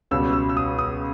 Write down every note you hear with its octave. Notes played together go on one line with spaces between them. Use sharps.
C#2 B2 G3 E6
E6
E6
D#6
D#6